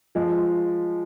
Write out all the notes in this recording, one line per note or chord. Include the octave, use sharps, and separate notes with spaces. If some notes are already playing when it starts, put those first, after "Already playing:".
F3 G#3